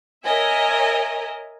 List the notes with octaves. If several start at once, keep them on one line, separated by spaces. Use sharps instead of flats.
A#4 C#5 D#5 E5 G#5